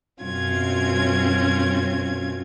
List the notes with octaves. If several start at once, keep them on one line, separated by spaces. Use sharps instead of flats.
F#2 B2 C4 C#4 F4 G#6